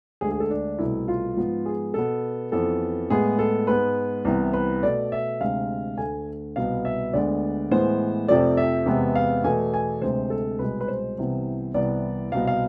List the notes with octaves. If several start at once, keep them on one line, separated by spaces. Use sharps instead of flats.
D2 D3 G#3 G#4
G#4
A4
D4
C2 B2 A3 E4
F4
G#2 F3 B3
G#4
B2 B3 A4
F2 E3 B3 A4
A2 G#3 B3 G#4
A4
G#2 G#3 B3 B4
C2 C3 E3 B3
B4
B2 A3 D5
E5
D2 C3 G#3 F5
D2 D3 A3 G#5
C2 B2 B3 F5
E5
D2 D3 G#3 B3 D5
A2 E3 G#3 B3 C5
F2 C3 F3 A3 D5
E5
E2 C3 G#3 B3
F5
E2 B2 A3 G#5
G#5
D2 C3 G#3 C5
A4
C2 B2 G#3 B4
B4
C5
C2 C3 E3 B3
C2 C3 E3 B3 D5
C2 B2 B3 F5
F5